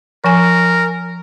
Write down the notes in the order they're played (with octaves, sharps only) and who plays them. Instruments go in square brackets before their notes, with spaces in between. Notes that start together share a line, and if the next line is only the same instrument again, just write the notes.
[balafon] F3 G#5 [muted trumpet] A#4